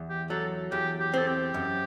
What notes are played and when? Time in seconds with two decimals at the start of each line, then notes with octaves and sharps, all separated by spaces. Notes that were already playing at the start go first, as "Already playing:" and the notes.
Already playing: E2
0.09 G4
0.30 F#3 A4
0.72 E2 G4
1.00 G4
1.14 C4 A4
1.27 G4
1.54 F#2